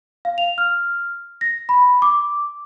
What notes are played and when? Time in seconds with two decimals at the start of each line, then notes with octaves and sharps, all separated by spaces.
0.25 F5
0.38 F7
0.58 F6
1.41 A#6
1.69 B5
2.02 D6